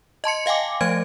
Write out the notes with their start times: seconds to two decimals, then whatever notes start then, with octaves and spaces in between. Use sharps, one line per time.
0.24 D#5 A5 C6 C#7
0.46 D#5 F5 G5 G#5 D6
0.81 F3 A3 C5 G#6 D7